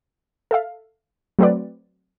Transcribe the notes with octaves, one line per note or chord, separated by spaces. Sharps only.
A4 E5 F5
F#3 A3 C4 F#4 B4 D5